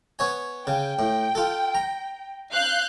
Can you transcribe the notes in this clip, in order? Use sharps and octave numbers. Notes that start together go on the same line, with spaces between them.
B3 C#5 G#5
C#3 G5
A2
F4 A4
A#5
F5 F#6 G6